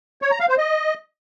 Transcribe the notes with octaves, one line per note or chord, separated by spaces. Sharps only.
C#5
A#5
F5
C5
D#5